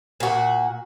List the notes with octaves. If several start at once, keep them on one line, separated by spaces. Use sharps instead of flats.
A#2 F#4